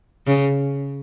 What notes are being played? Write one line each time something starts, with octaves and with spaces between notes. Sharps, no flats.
C#3